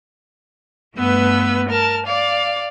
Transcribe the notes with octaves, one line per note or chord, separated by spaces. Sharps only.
G2 A3 B3 B4 E6
A#4 A5 F6
D5 F5